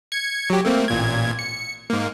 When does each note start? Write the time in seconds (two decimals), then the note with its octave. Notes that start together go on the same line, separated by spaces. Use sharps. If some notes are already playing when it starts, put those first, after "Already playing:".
0.12 G#6 C#7
0.50 F#3 G4
0.65 A3 A#3 C4
0.88 A1 A#2 G#6
1.39 C#7
1.90 G#2 A#3